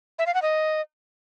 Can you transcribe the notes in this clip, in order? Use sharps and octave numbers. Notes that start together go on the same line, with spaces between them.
E5
F5
F#5
D#5